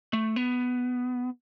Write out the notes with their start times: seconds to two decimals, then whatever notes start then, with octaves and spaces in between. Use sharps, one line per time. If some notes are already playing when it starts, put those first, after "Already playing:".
0.13 A3
0.36 B3